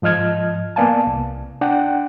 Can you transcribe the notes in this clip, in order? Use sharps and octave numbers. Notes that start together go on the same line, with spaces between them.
G#2 F3 D#5 F6 G#6
A#3 B3 D5 F5 G#5 A5
C2
D4 F#5 G5